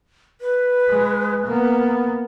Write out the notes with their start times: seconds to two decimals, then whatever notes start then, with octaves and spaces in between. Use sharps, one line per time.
0.41 B4
0.88 G#3
1.45 A#3 B3